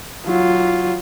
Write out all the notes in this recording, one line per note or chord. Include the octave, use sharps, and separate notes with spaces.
F#3 F4